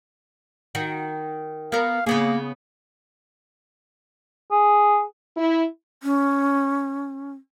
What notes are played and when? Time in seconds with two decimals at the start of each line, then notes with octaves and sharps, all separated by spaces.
0.75 D#3 F#4
1.72 B3 A#4 F5
2.06 C#3 A#3 B3 G#4
4.51 G#4
5.37 E4
6.03 C#4